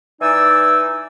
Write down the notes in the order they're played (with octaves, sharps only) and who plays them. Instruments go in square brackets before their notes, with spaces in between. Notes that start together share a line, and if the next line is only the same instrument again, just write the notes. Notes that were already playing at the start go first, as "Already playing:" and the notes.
[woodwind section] E3 D#4 D5 G#5 E6